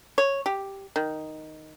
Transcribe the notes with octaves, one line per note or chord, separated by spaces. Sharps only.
C#5
G4
D#3